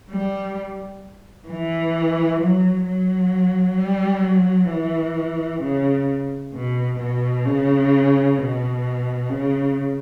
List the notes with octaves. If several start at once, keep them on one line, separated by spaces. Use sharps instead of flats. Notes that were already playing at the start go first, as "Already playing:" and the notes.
G3
E3
F#3
F#3
G3
F#3
E3
C#3
B2
B2
C#3
B2
C#3